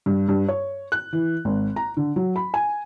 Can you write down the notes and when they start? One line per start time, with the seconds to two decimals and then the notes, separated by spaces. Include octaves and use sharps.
0.06 G2
0.29 G2
0.49 C#5
0.92 F#6
1.13 E3
1.45 G#1
1.76 A#5
1.97 D3
2.16 F#3
2.36 B5
2.54 G#5